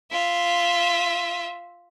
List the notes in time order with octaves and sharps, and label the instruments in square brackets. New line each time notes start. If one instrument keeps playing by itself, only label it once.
[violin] F4 E5